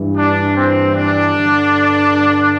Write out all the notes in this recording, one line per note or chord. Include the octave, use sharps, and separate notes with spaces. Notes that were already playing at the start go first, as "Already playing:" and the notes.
Already playing: G2 E3
D4
C4
D4
G2 D3